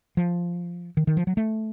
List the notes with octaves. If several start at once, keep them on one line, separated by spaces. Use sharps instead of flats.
F3
D#3
D#3
F3
F#3
A3